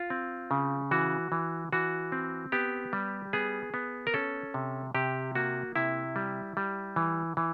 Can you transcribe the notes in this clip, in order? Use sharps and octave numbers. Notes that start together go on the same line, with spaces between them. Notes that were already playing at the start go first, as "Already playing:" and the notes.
Already playing: F4
C4
C#3
E3 F#4
E3
E3 F#4
C4
B3 G4
G3
B3 G#4
B3
A#4
C#4 A4
C3
C3 G4
A#3 F#4
C3 E4
G3
G3
E3
E3